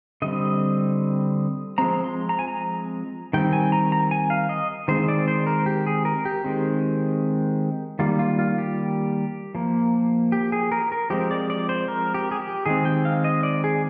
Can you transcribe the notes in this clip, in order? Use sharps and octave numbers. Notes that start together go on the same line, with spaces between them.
D3 G3 C4 D#5
F3 G#3 C4 A#5
C6
A#5
G#5
A#5
D#3 G3 C4 G5
G#5
A#5
A#5
G#5
F5
D#5
D#3 G#3 C4 C5
D5
C5
A#4
G4
G#4
A#4
G4
D#3 G#3 C4
D#3 G3 A#3 F4
F4
F4
G4
F3 A#3
G4
G#4
A#4
A#4
F3 G#3 C4 G4
D5
D5
C5
A#4
G4
G#4
G4
D#3 G#3 C4 G#4
G5
F5
D#5
D5
G#4